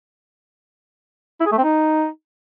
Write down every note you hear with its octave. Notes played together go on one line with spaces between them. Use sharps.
E4
G#4
A3
C4
D#4